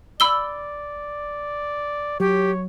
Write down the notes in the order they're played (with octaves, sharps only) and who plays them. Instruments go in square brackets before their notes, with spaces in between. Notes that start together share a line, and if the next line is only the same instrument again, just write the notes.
[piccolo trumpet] D5 [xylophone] B5 E6 G7
[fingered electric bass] F#3 [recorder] G4 [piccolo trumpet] C#5